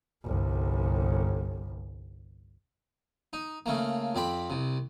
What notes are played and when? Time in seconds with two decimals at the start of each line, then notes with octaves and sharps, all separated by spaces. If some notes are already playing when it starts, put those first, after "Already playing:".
0.23 G1 C2
3.33 D#4
3.66 C#3 A3 A#3
4.15 F2 C4 D5 B5
4.50 C2 C3